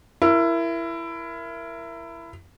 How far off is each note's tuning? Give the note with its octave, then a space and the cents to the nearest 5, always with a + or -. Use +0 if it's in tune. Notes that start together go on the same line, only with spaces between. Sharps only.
E4 +20 A#4 +0